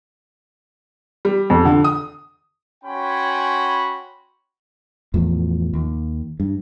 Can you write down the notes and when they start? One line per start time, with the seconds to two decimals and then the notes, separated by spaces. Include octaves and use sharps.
1.25 G3
1.50 F2
1.65 D3
1.84 D#6
2.84 C#4 F#4 G5 G#5 B5 C6
5.14 E2 A2 F3
5.73 D#2
6.40 G2